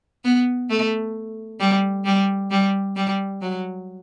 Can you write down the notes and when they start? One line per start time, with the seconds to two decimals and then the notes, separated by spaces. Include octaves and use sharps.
0.25 B3
0.70 A3
1.60 G3
2.05 G3
2.51 G3
2.96 G3
3.41 F#3